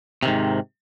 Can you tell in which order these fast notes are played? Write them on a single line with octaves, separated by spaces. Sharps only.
C3 D#3 G#2